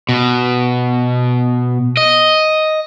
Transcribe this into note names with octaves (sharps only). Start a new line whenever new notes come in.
B2
D#5